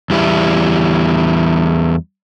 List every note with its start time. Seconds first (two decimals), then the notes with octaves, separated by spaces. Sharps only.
0.10 E2 G3 E4